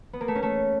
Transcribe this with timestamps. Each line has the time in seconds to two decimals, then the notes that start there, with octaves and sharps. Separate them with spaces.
0.13 B3
0.21 A#3
0.28 A3
0.35 C#4
0.43 A3